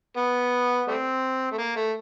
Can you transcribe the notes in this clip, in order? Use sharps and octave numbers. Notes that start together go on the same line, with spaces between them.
B3
G3 A3 C4
A3
A#3
A3